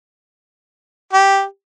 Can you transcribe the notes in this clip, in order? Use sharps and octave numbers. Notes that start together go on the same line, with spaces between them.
G4